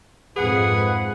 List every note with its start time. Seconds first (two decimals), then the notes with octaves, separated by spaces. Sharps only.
0.36 F2 G#2 G#4 B4 F#5